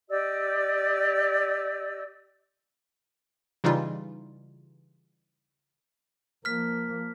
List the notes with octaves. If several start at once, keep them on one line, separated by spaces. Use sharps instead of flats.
G4 D5 D#5 E6
C#3 E3 G3 D#4 F4
F3 A#3 F6 B6